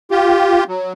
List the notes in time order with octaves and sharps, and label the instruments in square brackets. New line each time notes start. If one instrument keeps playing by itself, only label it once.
[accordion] F4 G4
F#3